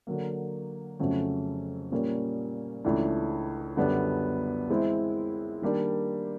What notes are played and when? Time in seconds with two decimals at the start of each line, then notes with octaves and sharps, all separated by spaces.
0.07 D3 F#3 A#3
0.99 F2 C#3 F#3 A3 C#4
1.92 A#2 G3 A#3 C#4
2.84 C#2 C#3 E3 A3 D4
3.77 F#2 D3 G3 B3 D4
4.70 E3 G#3 C4 E4
5.62 D#3 G3 A#3 D4